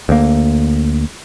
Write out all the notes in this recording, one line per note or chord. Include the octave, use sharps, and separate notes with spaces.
D2 A#3